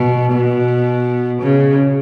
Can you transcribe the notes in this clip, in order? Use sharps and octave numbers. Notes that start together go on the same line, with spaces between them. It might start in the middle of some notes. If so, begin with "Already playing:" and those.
Already playing: B2
B2
C#3